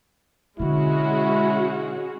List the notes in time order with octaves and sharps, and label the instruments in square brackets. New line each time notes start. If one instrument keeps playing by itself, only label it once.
[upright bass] B2 D3 [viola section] G#3 C#4 F#4 [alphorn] E4